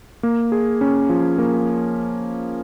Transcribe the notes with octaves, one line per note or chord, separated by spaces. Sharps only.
A#3
G#4
C#4
F3
A#3